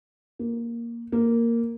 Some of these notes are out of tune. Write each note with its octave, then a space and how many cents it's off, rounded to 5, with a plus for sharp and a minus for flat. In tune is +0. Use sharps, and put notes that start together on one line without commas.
A#3 +5
A#3 -5